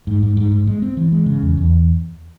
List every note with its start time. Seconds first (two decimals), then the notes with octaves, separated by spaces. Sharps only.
0.07 G#2
0.23 G#2
0.37 G#2
0.52 G#2
0.67 G#3
0.82 C4
0.97 E3
1.12 G#3
1.26 C#3
1.42 E2
1.57 E2